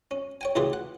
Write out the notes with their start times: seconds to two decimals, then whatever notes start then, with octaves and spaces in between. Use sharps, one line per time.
0.11 C#4
0.41 C#5 G5 G#5
0.55 C#2 A2 E3 F4 G4 G#4
0.73 F#5